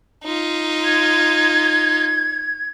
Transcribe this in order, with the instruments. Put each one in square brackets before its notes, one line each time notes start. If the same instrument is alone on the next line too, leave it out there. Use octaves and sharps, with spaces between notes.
[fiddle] D#4 F4
[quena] G#6